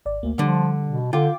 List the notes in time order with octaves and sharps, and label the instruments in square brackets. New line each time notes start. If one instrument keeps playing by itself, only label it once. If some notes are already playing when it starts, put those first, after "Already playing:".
[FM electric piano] G#1 D5
[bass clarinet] D2 [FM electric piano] A#3
[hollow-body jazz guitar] D3 [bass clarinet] F3 [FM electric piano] G3
[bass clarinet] B2
[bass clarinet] D3 [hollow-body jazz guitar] F4 [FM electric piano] G5 D6